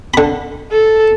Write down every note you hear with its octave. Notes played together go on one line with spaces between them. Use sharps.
D3 B5
A4